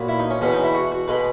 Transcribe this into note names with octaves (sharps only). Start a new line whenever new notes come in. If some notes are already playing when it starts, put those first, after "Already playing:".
Already playing: A#2 F#3 B3
E4
D#4
C#4
E2 B2 G#3 B3 C#4
D#4
E4
F#4
F#4
B2 G#3 B4